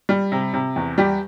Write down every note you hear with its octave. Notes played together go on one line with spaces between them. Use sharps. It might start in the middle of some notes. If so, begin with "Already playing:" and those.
G3
C3
C3
E2
G3 G4